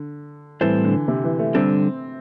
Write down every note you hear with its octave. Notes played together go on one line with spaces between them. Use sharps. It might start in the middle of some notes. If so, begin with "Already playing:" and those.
Already playing: D3
A2 E3 G3 C4 A4 C5
D3
C3
E3
A3
D3 G3 C4 D4 A4